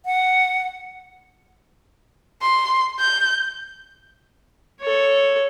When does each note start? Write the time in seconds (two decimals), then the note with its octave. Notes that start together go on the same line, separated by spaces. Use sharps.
0.06 F#5
2.42 C6
2.99 G6
4.81 A4 C#5